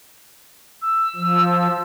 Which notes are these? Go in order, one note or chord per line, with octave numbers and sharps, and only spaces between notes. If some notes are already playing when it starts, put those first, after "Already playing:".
E6
F3